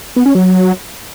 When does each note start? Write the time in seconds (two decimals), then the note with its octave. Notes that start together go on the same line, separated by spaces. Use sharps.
0.16 B3
0.26 C#4
0.35 F#3